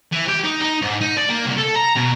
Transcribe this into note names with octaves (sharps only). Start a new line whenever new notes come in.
E3
G4
D#4
D#4
G#2
D#4
D5
A#3
C2
A4
A#5
B2